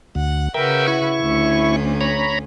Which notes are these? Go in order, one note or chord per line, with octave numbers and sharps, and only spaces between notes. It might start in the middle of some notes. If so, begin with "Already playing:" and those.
D2 F#5
C#3 F#4 A#4 B4 E5 G5
E4 C#6
D2 C#4
C#5 A#5 B5